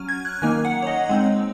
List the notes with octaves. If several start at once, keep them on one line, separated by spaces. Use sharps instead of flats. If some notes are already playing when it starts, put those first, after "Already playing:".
Already playing: F#3 C#4 F6
G#6
F#6
D#3 A#3 D#4 G#5
F#5
C#5
D#5
G#3 C4 D#4